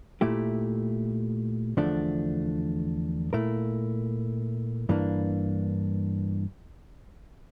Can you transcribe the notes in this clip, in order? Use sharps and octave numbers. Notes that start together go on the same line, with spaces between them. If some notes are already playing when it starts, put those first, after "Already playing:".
A#2 A3 E4 G4
E2 D3 F3 A3 D4
A#2 A3 E4 A#4
G2 E3 A#3 D4